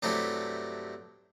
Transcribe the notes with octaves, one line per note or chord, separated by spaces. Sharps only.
G2 C3 F#3 A3 E4 G4